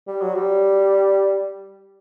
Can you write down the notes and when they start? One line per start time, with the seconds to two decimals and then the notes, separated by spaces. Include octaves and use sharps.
0.07 G3
0.21 F#3
0.35 G3